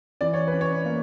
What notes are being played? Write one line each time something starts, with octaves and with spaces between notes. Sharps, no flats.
E3 D5
C#5
C#4 B4
C#5
A#3